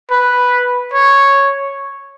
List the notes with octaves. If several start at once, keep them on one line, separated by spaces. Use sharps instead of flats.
B4
C#5